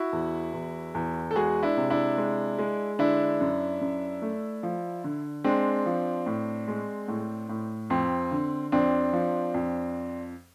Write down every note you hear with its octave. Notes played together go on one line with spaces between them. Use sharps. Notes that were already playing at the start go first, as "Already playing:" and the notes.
Already playing: E4 F#4
E2
E2
E2
A4
G#3 F#4 G#4
D4 E4
C3
D4 E4
G#3
G#3
D3 D4 E4
F#2
F#2
A3
F3
D3
G#3 C4 D4
F3
A2
G#3
A2
A2
F2 C4
D3
F2 C4 D4
F3
F2